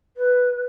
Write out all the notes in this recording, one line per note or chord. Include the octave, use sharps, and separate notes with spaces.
B4